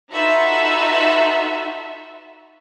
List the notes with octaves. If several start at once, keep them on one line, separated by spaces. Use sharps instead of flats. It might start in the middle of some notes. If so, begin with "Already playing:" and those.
D#4 F4 F#4 A4 B4 E5